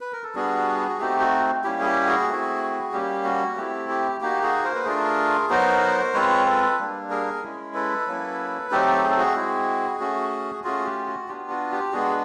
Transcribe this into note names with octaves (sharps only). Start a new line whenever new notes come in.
B4
A#4
A4
G3 B3 D4 F#4 G#4
F#4
A3 C4 D#4 F#4 G4
F#4
G3 A#3 C#4 E4 G4
G#4
G4
F#4 G#4
A3 C4 E4
G3 A#3 C#4 G4
F#4
A3 C4 E4 G4
G4
A#3 D#4 F#4 G4
F#4 G#4
A#4 C5
B4
A3 D4 F4 G#4 A#4
F#3 B3 D#4 F#4 A#4 C5
G#3 C4 F4 B4 C#5
A4 B4
G3 A#3 D4
G#4 A#4
G#3 C#4 E4
A4 B4
F#3 A#3 C#4 E4
F#3 A3 C4 D#4 G4 A4
G#4
A4
F#4 G#4
G#3 C4 E4
A3 C#4 F#4
A3 C#4 F4 F#4 G#4
G4
F#4
B3 D4 F4 G4
F#4
G4
G#3 B3 D4 F#4 G#4